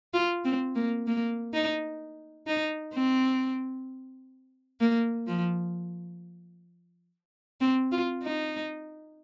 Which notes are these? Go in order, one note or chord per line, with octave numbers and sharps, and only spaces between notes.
F4
C4
A#3
A#3
D#4
D#4
C4
A#3
F3
C4
F4
D#4